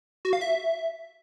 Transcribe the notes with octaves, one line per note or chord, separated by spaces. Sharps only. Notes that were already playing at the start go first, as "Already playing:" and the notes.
F#4
F5
E5